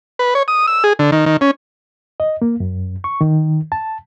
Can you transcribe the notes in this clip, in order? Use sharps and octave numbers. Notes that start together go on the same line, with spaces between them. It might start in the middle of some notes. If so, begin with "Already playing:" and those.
B4
C#5
D#6
E6
G#4
D3
D#3
D#3
C#4
D#5
A#3
F#2
C#6
D#3
A5